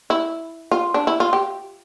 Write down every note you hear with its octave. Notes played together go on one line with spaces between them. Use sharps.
E4
F4
D4
E4
F4
G4